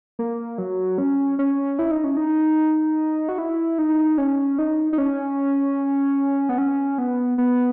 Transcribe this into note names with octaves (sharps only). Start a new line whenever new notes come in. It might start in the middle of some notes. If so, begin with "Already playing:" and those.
A#3
F#3
C#4
C#4
E4
D#4
C#4
D#4
F#4
E4
D#4
C#4
D#4
D#4
C#4
B3
C#4
B3
B3